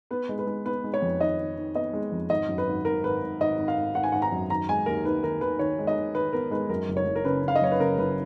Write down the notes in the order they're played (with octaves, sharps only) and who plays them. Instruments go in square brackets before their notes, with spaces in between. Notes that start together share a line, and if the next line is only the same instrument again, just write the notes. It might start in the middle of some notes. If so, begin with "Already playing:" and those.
[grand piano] B3 B4
G#3
B4
G#3
B3 B4
G#3
C#5
F2
D#3 D#5
D#3
D#3
B3 D#5
G#3
F2
G#1 D#5
F#2
B4
G#1
G#1 A#4
G#1 B4
G#1
G#1 D#5
G#1
F5
G#1
G#1 F#5
G#5
G#1 F#5
A#5
F#2
D#3 A#5
G#3 G#5
D#2 A#4
D#3 B4
D#3 A#4
D#3 B4
D#3 C#5
G#3
D#5
D#3
D#3 B4
B3 A#4
G#3 B4
F#2 A#4
F#1
C#5
F#1
A#4
C#3 B4
C#3 F5
D#5
F#1 C#5
B4
C#3 A#4
F#1 B4